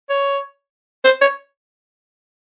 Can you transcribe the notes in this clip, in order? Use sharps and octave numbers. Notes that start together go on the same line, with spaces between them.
C#5
C5
C#5